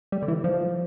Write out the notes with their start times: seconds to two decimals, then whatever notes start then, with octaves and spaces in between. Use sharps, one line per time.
0.12 G3
0.23 D3
0.28 E3
0.44 F3